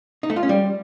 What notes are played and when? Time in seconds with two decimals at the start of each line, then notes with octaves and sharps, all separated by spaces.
0.23 D#4
0.30 A3
0.36 F4
0.43 C#4
0.49 G3